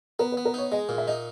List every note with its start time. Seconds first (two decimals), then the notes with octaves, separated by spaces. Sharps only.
0.19 B3 A#4
0.32 B4
0.37 B3
0.45 A#4
0.54 D#4 C#5
0.72 G#3 D#5
0.89 A#2
0.98 E5
1.07 D#4 D#5